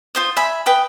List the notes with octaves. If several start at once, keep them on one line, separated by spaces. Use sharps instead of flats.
F4 C5 D#6
E5 G#5 B5
B4 G5 B5 D#6